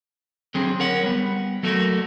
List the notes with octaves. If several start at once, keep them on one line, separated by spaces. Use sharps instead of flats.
D3 F#3 C4 G#4
A#4 C#5 F#5
G3 B3
F#3 A3 A#3 F#4 A4 A#4